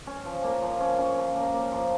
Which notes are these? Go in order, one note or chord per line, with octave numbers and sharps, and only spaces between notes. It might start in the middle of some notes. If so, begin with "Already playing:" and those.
C#4
F3
A#3
F3
C#4
C#4
F3
A#3
A#3
F3